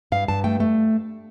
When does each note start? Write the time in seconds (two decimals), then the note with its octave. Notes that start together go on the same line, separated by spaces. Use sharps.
0.12 G2 F5
0.28 G2 A5
0.44 A3 G5
0.60 A3